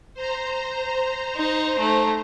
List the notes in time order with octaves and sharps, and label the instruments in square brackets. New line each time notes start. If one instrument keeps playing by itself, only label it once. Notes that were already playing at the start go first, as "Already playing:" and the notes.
[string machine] C5 A#5
[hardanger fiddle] D#4
A3